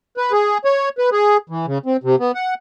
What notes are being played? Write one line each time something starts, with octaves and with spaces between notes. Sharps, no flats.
B4
G#4
C#5
B4
G#4
E3
C#3
C4
C3
B3
F#5